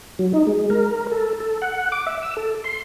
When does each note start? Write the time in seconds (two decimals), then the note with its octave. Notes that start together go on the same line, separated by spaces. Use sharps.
0.19 F#3
0.33 D#4
0.47 G#3
0.70 A#4
1.12 A4
1.40 A4
1.62 F#5
1.92 D6
2.07 E5
2.22 E6
2.37 A4
2.64 C6